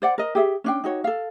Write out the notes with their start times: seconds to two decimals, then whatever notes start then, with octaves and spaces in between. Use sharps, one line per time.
0.02 C5 D5 F#5
0.18 A#4 D#5
0.35 G4 G#4 E5
0.64 C#4 D4 G5
0.84 D#4 F#4 C#5
1.04 A4 F5